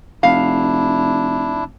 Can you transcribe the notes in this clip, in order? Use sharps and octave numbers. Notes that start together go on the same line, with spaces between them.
F1 D4 E4 F5